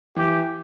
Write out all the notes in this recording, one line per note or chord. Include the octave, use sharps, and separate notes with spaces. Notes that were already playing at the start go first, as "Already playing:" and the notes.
E3 G4